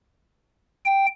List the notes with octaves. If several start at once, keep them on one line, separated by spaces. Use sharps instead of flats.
G5